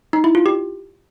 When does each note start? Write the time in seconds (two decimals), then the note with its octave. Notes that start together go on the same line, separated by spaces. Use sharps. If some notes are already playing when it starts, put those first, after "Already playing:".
0.13 D#4
0.24 E4
0.35 F4
0.46 G4